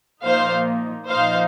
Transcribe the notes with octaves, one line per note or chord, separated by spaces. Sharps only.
A#2 F3 A#3 D#4 C5 F5
A#2 F3 D#4 C5 F5